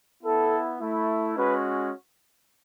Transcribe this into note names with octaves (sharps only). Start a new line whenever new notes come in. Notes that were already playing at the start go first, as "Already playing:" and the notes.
B3 E4 A4
A3 E4
G#3 C#4 F#4 B4